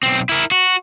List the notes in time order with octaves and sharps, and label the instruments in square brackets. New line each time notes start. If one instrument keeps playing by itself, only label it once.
[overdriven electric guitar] B1 C4
E4 A#4
F#4